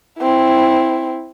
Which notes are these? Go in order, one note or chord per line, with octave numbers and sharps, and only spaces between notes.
C4 E4